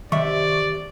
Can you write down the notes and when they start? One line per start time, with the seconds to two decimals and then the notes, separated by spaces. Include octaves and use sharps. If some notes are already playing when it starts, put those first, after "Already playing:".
0.12 C3 D#3 D5 E5 C#6